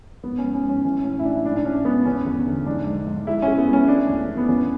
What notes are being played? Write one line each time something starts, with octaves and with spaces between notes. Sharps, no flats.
G#2 B3
C#4
G#2
C#4
G#2
C#4
E3 C#4
A2 C#4
E4
A2 D4
G#2 D4
D4
G#2 C#4
G#2 B3
E2 C#4
E2
D3
G#2 D4
G#2
G#2
G#3 E4
C#4
G#3
B3
G#3
C#4
A3 D4
E2
E2
B3
E2 C#4